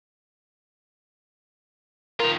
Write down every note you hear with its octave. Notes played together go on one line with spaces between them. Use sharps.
D#3 F4 A#4